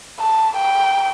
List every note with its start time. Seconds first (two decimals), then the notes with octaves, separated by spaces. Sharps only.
0.20 A5
0.57 G5